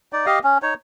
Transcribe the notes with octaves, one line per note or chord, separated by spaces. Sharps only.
D#4 D5
G4 D#5 F5
C#4
D#4 C#5